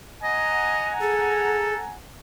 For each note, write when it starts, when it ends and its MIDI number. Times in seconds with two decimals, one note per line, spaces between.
0.23 0.93 75
0.23 1.95 78
0.23 1.95 80
0.23 1.95 82
1.01 1.74 68
1.01 1.80 69